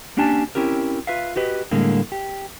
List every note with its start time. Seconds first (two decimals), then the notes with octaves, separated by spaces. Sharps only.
0.17 A#3 C#4 D4 G4 G#5 A5
0.55 C4 C#4 E4 G4 A#4
1.07 F4 B4 E5 F5
1.36 F#4 G4 B4 D#5
1.71 A2 D3 G3 G#3 A#3
2.12 G4